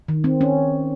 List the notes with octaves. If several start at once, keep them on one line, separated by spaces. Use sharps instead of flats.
D#3
C4
C#4